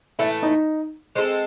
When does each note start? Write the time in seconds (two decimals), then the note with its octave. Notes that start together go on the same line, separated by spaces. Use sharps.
0.19 A2 E3 A3 E4
0.43 D#4
1.15 G#3 C4 F4 A4